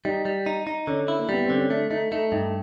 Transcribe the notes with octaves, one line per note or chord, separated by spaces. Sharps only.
G3 D#4
G3
D#4
D#4
D3 C#4
E4
A#3
G3 B3
D3 C4
C#4
A3 D4
A3 D#4
A3 D#4
G2 D#4